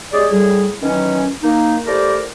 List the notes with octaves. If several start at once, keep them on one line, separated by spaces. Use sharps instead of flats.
G#3 C#4 G4 G#4 D5
A2 G3 G#4
D#3 E3 F#3 C#4
A#3 D#4
A3 E4 G4 A#4 C5 D5